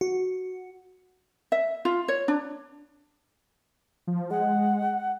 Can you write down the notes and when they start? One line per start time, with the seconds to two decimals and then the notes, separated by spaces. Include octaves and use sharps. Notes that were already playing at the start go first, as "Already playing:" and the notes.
0.01 F#4
1.52 E5
1.85 F4
2.08 C#5
2.28 D4
4.07 F3
4.31 G#3 F#5